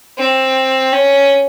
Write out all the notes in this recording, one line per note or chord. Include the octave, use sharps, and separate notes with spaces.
C4
C#4